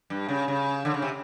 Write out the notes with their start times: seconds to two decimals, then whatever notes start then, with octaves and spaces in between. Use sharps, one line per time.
0.10 G2
0.29 C#3
0.48 C#3
0.85 D3
0.94 C#3
1.02 C3